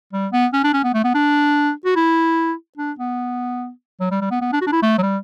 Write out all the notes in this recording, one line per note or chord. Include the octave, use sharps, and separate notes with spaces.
G3
B3
C#4
D4
C#4
B3
A3
B3
D4
F#4
E4
D4
B3
F#3
G3
G3
B3
B3
D4
F#4
D4
E4
A3
F#3
G3